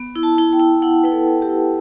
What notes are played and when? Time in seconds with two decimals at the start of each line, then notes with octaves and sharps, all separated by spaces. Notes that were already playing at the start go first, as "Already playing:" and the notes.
Already playing: B3
0.16 E4
0.23 A5
0.38 E4
0.53 G5
0.60 E4
0.82 E4 F#5
1.04 E4 B4
1.12 A4
1.28 E4
1.42 G4
1.49 E4